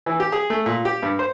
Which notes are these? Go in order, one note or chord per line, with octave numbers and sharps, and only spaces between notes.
E3
G4
G#4
A3
A#2
G4
G2
C5